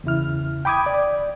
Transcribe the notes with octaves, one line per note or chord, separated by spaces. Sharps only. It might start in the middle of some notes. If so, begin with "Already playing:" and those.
E2 C#3 E4 F6
G5 B5 D6 D#6 G#6
D5